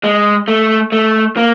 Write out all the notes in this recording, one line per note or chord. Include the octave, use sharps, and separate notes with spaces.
G#3
A3
A3
A#3